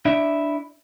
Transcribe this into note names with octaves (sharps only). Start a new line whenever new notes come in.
D4 E4 D5 E5